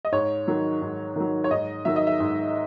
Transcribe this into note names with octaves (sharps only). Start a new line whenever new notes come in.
D#5
G#2 C#5
D#3 F#3
G#2
D#3 F#3
C#5
G#2 D#5
D#3 F#3 E5
D#5
E5
G#2